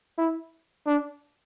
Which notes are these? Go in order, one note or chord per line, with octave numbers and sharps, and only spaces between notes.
E4
D4